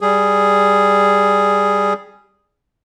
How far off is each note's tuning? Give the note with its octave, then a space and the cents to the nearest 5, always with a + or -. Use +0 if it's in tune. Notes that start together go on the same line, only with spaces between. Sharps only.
G3 +5 G#4 +0